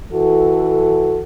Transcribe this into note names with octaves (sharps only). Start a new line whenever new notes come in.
E3 F#4 A4